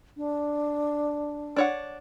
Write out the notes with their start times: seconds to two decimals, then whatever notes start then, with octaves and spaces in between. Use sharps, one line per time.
0.17 D4
1.56 D4 C#5 F#5